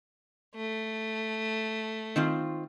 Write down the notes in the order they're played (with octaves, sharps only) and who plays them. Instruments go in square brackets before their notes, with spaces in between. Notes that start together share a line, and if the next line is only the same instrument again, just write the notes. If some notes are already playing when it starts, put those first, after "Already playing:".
[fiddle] A3
[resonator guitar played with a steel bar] D#3 C4 F4